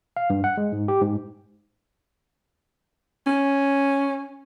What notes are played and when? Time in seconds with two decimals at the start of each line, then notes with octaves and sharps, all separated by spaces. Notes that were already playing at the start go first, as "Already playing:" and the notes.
0.17 F5
0.30 G2
0.44 F#5
0.57 G#3
0.72 G#2
0.88 G4
1.02 G#2
3.27 C#4